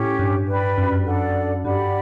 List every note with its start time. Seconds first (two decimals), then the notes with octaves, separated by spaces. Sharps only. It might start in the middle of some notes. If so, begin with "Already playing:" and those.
Already playing: A2 C#4 G4 C#5
0.19 G2
0.48 B4 D5 G5 B5
0.78 F#2
0.92 F#2
1.06 D4 A4 D5 F#5
1.63 G2 G4 D5 F#5 B5